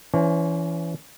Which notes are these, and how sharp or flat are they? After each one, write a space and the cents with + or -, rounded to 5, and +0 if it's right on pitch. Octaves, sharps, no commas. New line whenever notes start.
E3 +20 C#4 +35 C5 +45